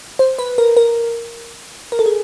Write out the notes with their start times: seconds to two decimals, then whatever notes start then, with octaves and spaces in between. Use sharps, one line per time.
0.19 C5
0.39 B4
0.58 A#4
0.77 A#4
1.92 A#4
1.99 A4
2.06 G#4